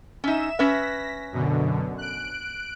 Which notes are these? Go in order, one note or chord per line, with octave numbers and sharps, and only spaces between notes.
C#4 D#4 E5 E7
C#4 B4 E5 A#6 B6
F#2 B2 D3
F#6 D7